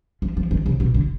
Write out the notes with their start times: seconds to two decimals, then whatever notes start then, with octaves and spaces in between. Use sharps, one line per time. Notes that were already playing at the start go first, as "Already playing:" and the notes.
0.22 F3
0.37 F3
0.51 D#3
0.66 C3
0.80 B2
0.94 D3